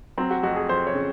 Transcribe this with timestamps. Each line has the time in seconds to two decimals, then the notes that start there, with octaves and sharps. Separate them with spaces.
0.18 F#3 C4
0.31 F#4
0.43 F2 F#4
0.56 G#4
0.69 F2 C5
0.87 C#5
0.95 C#3